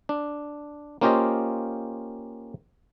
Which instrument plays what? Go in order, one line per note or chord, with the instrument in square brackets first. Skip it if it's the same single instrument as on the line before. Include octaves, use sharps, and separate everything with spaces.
[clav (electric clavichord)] D4
A#3 C#4 F4 G4 C5 D#5